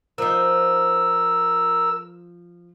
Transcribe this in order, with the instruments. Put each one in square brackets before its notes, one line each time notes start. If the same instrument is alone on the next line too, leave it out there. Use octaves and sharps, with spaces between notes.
[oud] F3 D#4 [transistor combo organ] A#4 E6